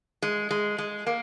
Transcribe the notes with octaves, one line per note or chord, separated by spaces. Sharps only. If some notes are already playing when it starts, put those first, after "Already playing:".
G#3
G#3
G#3
A#3